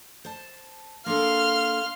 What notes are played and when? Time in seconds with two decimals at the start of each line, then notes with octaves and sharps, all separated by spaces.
0.25 C5 A5
1.06 A#3 D4 A4 F5 C6 F6